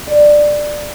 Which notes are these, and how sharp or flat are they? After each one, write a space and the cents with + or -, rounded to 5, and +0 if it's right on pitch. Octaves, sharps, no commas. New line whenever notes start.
D5 +10